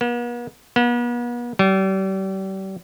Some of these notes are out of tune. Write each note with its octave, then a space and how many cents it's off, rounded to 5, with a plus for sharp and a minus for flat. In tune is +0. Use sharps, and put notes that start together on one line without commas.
B3 -45
B3 -40
G3 -35